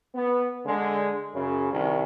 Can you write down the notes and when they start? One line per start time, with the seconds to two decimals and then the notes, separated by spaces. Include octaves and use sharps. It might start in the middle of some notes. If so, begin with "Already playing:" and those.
0.14 B3
0.65 D3 G#3
1.33 F#2 C#3
1.72 C2 D#3